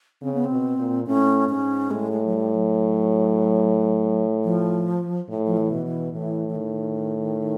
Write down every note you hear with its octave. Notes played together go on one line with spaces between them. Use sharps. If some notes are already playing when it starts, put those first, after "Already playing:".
C#3 C4
B3
C4
B2
A#2
A2 C#4
G#2 C#4
A2 G#3
G#3
F#3
G3
F#3
F3
A2
F3
E3
B2
E3
A2 E3
E3
D#3